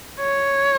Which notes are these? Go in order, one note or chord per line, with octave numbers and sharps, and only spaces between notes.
C#5